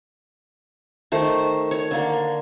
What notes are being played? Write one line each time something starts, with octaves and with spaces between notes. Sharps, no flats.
D#3 A3 C5
C#5
D3 A#3